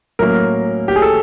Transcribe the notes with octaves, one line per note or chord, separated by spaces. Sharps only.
A2 F#3 A#3 C#4 A#4
G4
G#4
A4